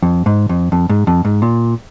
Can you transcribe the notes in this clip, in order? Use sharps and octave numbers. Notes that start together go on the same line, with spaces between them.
F2
G#2
F2
F2
G#2
F2
G#2
A#2